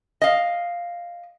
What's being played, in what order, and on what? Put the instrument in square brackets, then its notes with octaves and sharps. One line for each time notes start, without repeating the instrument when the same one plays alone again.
[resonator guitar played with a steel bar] D#5 F5